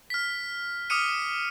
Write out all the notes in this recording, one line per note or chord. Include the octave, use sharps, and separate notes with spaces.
F6 B6
D6 D#6 F6 C#7 D#7